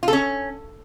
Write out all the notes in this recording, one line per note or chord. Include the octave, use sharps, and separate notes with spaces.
F4
A4
C#4